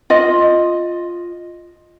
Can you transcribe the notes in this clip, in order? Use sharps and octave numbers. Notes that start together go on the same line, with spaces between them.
F4 D#5